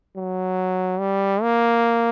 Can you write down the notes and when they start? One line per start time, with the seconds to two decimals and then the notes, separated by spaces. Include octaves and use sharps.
0.16 F#3
0.99 G3
1.42 A#3